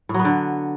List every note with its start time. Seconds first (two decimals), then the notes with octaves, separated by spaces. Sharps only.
0.09 A2
0.14 F#3
0.19 B3
0.25 D3